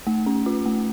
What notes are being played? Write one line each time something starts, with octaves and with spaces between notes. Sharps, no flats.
A3
C#4
F4
A3